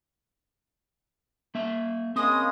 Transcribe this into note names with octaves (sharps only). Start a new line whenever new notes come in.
A#3 E5
C#3 G#3 A#3 C4 D#6